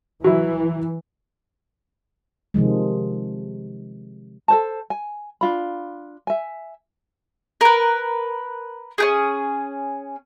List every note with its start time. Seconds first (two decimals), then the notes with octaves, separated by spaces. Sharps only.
0.24 E3 F#3 E4
2.54 C3 D#3 F3 G#3
4.48 A4 C5 A5
4.90 G#5
5.41 D4 F4 B5
6.27 E5 G#5
7.61 A#4 B4
8.98 C#4 G4 G#4